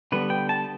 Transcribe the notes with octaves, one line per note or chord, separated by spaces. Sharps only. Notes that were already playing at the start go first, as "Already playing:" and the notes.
D3 G3 B3 D4 B4
G5
A5